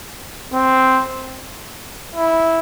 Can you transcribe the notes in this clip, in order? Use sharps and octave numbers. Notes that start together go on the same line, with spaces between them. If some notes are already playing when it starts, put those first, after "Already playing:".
C4
E4